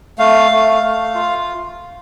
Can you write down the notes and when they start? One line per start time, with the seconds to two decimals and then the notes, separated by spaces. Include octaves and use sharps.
0.18 A3 F5
0.51 A3
0.83 A3
1.15 F4